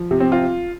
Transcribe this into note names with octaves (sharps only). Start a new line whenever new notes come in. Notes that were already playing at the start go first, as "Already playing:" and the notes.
Already playing: F3
C3
C4
F4